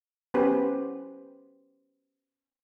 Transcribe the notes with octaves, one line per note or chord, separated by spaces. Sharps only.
B3 C#4 G4 B4 C5